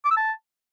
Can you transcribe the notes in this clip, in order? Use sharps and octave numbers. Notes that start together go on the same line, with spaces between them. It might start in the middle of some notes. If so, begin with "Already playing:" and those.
D6
E6
A5